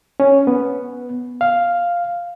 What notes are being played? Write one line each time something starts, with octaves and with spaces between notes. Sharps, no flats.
C#4
B3
F5